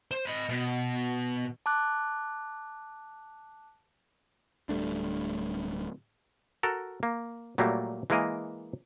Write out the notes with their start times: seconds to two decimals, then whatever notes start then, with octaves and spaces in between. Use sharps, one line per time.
0.11 C5
0.25 D#5 B5
0.49 B2
1.66 A5 D6 F#6
4.69 D1 G3 A3 D4
6.63 F#4 A4 A#4
7.03 A#3
7.58 A#2 F#3 G3 A3 A#3
8.10 E3 G#3 A#3 A#4 D#5